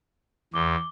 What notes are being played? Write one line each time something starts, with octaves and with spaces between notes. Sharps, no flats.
E2 D6 G7